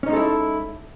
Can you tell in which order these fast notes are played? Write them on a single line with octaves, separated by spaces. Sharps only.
C#4 D#4 G#3 A4 E4